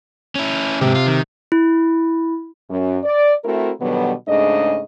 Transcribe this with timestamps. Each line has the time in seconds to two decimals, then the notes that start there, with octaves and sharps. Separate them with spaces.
0.35 C#4 E4
0.81 G#2 C3 G4
0.95 F4
1.07 D#3
1.52 E4
2.69 F#2
3.04 D5
3.45 A3 C4 E4 F#4 A#4
3.81 B2 D3 D#3 F#3 G3 B3
4.28 G#2 C#3 A3 D4 D#5